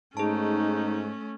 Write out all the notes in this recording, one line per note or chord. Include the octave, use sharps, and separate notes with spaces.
G#2 A3 C#4 D#4 G#4 A5